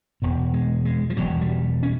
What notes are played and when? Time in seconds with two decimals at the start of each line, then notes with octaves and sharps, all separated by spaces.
0.22 E1 E2 B2
0.54 G#3
0.85 G#3
1.10 F3
1.17 E1 E2 B2 F#3
1.41 G3
1.83 C#4